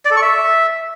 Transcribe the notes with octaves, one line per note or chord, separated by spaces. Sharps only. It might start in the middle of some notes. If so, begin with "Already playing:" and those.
D5
A4
C#6
E5